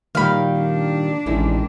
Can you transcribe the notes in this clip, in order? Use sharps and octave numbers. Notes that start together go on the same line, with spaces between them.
A#2 D#3 G3 A#3 F5 B5
D4
A1 D#3 G#3 E4